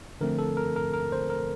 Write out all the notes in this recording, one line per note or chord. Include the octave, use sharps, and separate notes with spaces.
D3 F3 A3 C4 A#4
A4
A#4
A#4
A#4
C5
A#4